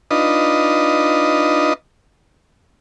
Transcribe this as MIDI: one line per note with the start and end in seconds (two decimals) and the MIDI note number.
0.11 1.73 62
0.11 1.73 63
0.11 1.73 65
0.11 1.73 71
0.11 1.73 75